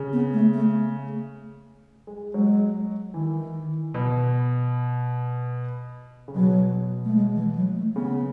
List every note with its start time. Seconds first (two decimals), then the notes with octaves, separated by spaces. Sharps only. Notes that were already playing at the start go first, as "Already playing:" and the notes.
Already playing: C#3
0.13 B3
0.33 A3
0.53 A3
2.07 G#3
2.34 F#3 G#3
3.14 D#3 E3
3.94 B2
6.28 C#3
6.35 B2 F#3
7.05 A3
7.15 G#3
7.35 E3
7.56 F#3
7.75 A3
7.95 C#3 B3